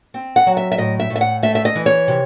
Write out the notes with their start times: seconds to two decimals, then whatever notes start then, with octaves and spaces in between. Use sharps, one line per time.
0.14 C4
0.36 F#5
0.47 F#3
0.57 E5
0.72 E5
0.78 A2 D#5
1.00 E5
1.10 A2
1.16 E5
1.21 F#5
1.43 A3 E5
1.55 E5
1.65 D#5
1.76 E3
1.86 C#5
2.08 C3